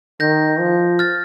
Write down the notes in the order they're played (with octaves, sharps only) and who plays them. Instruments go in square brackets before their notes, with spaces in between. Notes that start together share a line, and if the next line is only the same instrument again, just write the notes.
[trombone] D#3 [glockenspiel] G6 A#6
[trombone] F3
[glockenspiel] F6 A6